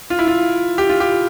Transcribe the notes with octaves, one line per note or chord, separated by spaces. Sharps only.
F4
E4
F4
G4
F4
G4